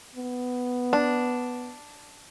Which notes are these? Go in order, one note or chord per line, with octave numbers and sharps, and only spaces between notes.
B3
D4